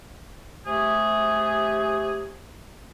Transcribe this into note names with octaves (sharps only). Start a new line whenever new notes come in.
C3 A3 G4 G#4